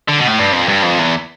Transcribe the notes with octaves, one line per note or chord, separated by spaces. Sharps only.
D3
B2
A2
G2
F2
G2
F2
E2